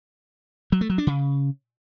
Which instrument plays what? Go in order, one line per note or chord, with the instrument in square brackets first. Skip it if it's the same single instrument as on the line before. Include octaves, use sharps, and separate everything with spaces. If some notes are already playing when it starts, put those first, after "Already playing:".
[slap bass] F#3
A3
F#3
D4
C#3